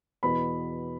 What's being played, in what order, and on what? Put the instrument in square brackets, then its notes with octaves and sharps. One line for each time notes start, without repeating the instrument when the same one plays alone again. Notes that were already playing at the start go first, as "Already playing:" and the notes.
[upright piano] E2 B2 B3 B5